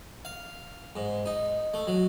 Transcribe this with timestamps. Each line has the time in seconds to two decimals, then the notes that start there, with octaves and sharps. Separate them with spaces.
0.25 F5
0.96 G#2
1.26 D#4
1.74 A3
1.87 F#3